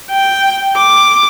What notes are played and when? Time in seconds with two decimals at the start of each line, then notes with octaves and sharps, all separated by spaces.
0.10 G5
0.76 D6